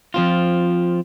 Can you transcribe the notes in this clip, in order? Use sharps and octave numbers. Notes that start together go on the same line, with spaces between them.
F3 C4 F4